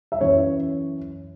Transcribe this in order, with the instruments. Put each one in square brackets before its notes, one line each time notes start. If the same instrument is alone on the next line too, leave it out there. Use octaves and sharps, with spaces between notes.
[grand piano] E5
F#2 E3 C#5